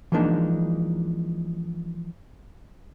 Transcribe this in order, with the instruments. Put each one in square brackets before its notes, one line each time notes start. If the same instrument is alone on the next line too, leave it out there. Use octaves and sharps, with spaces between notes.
[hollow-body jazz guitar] E3 F3 G#3 A#3 D4 D#4